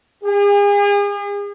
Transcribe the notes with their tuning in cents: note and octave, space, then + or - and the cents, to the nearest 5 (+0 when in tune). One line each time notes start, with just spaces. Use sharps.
G#4 -40